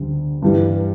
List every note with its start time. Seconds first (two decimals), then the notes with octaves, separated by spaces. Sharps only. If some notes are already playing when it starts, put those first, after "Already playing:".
Already playing: D2 D3 G3
0.42 G2 E3 G3